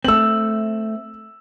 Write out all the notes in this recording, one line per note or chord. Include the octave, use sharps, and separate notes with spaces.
A3 C4 E6 F#7